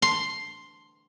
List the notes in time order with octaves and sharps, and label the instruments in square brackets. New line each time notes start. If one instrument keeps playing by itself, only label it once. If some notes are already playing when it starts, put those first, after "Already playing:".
[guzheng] C6